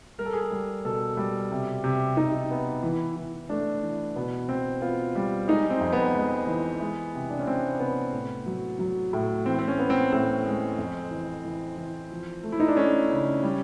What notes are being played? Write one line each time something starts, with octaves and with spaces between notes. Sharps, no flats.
G3 A#4
A4
G#4
A4
G3
B2 A4
G3
C3
C3
C3 D#4
B3
E3
E3
A3 D4
E3
B2 B3
B2 C4
B3 F4
G3
G#3 D#4
C4
F2
B3
G#3
E3
G#3
C3
D4
C#4
C3 C4
C3 B3
A2
F#3
F#3
A2
E3 C4
C4
C#4
B3
C4
A2 C4
G#3
F2
E3
E3
E3
F3
A3
E4
D#4
D4
A3 C#4
C#3
G3